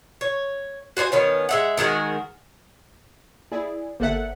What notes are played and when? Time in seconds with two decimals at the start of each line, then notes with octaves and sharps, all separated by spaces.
0.21 C#5
0.97 F#4 C5 C#5 G#5
1.12 D#3 B3 C#4
1.49 G#3 E5 F#5
1.77 D#3 G#3 F#4 A#4
3.52 E4 G#4 D5
4.00 G1 A#3 A4 C5 D5 E5 F#5